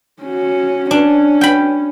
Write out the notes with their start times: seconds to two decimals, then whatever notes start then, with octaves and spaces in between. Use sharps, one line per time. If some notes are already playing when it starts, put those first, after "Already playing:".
0.22 C#4 F#4
0.91 C#4 D4
1.41 G5 B5